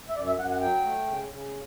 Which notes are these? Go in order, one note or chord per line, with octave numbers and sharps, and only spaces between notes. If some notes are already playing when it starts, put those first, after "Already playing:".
E5
F#2 D5
E5
F#2 F#5
F#5
F#3 G5
A3
C#3
C#3